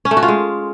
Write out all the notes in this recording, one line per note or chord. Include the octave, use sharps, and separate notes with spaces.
C#4
A3
F#4
F4
G#3